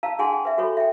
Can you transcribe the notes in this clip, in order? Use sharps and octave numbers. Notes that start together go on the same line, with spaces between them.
F5 A5 A#5 E6
D4 G#4 F#5 G#5 A5 C6
G5
B4 E5
F#4 A4 C#5 B5
E5 G5